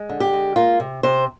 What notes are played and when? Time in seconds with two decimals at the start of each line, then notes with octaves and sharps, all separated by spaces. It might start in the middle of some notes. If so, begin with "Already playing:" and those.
Already playing: G#3
0.09 D3
0.20 G4
0.33 G#3
0.56 A#3 F4
0.80 C3
1.03 C3 C5